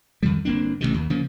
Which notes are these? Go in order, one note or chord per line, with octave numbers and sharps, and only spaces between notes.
F2 D#3 G3
G1 A#3 C4 D4
A1 G#2 C3 D#3
D#2
C#3 F3 A#3